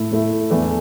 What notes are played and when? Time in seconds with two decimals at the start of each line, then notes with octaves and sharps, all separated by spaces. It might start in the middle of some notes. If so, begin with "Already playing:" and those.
Already playing: A2 A3 E4
0.11 A2 A3 E4
0.51 E2 E3 A3 D4